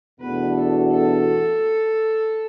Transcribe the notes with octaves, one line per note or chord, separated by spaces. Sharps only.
E2 B2 A3 D4 F#4 B4
A4
A4